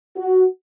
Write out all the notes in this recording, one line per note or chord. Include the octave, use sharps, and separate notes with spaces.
F#4